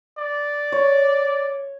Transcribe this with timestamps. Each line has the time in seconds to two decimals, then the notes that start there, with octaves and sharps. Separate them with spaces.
0.18 D5
0.72 C#5